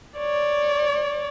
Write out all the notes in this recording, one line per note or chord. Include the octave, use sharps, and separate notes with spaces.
C#5 D5